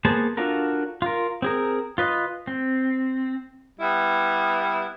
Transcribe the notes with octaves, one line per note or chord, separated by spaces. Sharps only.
A#3 B3 G#4 C5 A5
D4 F4 F#4 A4 A#4
F4 A#4
C4 G#4 A#4
F4 B4 D#5
C4
G3 B3 E4